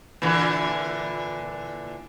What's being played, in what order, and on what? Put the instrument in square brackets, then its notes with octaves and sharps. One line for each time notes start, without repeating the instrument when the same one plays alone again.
[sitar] A#2 D3 E3